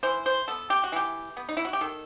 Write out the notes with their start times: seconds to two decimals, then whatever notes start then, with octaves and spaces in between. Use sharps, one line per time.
0.03 E3 C5
0.26 C5
0.48 B3 A4
0.70 G4
0.84 F#4
0.92 E3 G4
1.37 B3
1.49 D#4
1.57 E4
1.65 F#4
1.73 G4
1.81 D#3 A4